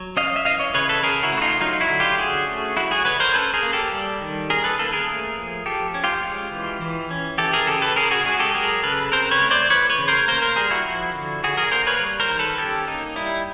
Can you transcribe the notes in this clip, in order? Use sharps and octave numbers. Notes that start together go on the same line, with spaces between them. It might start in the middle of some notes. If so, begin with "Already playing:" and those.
Already playing: F#3
C#4 D#5 F5
E5
E3 D#5 F5
C#5 D#5
C#3 B4 C#5
A4 B4
C#4 G#4 A#4
E4 F#4
A3
F#4
D#4 F4
F#3 D#4 F4
E4 F#4
D3
F4 G4
C#4 F#4 G#4
A3
F#3 E4 F#4
F#4 G#4
D3 B4 C#5
A#4 C5
C#4 A4 B4
G#4 A#4
A#3
G4 A4
G3
D#3
C#4 G#4 A#4
A4 B4
A#3 A4 B4
G#4 A#4
A3
F3
F3 G4 A4
C#4
F4 G4
G#3
E3
E3
C#4
E3 G4 A4
G#4 A#4
C#3 G4 A4
A4 B4
C#4 G#4 A#4
F#4 G#4
G#3 F#4 G#4
G4 A4
F#3 G#4 A#4
C#3 A4 B4
C4 A#4 C5
B4 C#5
A3
C5 D5
E3 B4 C#5
B4 C#5
C#3
A#4 C5
A#3 A#4 C5
A#4 C5
G3 G#4 A#4
E4 F#4
F3
D3
D3 F#4 G#4
G#4 A#4
A#3 A#4 C5
B4 C#5
G3
A#4 C5
D#3
A4 B4
C#4 G4 A4
A#3 D#4
G3 E4